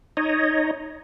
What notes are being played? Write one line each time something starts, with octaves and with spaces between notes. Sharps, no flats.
D#4 C#5 D#5